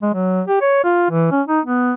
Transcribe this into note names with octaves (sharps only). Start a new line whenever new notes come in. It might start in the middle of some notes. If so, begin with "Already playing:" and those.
G#3
F#3
G4
C#5
F4
E3
C#4
D#4
B3